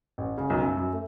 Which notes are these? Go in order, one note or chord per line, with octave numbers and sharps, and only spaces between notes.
A1
C#3
B1
F#2
F#2
A3